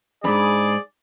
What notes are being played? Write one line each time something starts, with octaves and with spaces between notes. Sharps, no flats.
F2 G#2 D4 G#4 D5 B5